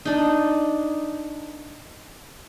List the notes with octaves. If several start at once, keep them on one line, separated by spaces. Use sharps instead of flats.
D4 D#4